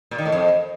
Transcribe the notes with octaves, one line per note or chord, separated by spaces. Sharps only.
A#2
D#3
A2
F2